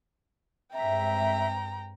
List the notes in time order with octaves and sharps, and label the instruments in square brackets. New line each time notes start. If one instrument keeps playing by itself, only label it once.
[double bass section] G2 G#3 C4 [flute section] E5 [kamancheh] G5 A#5